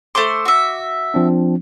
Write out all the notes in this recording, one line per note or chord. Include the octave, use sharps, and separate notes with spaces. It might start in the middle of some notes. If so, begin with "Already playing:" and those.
A3 C5 C6 D6
F#4 E5
F3 C4 D4